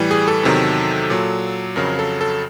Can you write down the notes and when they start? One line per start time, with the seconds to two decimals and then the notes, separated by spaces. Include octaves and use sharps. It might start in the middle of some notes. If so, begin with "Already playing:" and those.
Already playing: A2 E3 G3
0.11 G#4
0.28 A4
0.43 E2 C3 D#3 F#3
1.10 A#2 F#3
1.76 F2 C#3 F#3 A#4
1.99 A4
2.21 A4